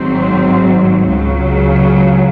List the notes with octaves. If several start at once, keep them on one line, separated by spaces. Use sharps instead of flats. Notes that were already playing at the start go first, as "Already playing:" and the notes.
Already playing: G#1 G#2 F#3 C4
C#2 C#3 F#3